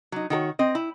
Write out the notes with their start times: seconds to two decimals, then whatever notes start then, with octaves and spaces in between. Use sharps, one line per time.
0.12 F#3 D#4
0.30 D#3 F#4 A4 C#5
0.59 C4 D#5
0.75 E4